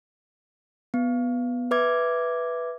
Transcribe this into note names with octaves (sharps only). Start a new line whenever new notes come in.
B3
B4 E5 D6 G#6